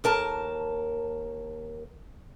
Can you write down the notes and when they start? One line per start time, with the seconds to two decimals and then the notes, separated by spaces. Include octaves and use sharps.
0.04 D#2 A#4 A5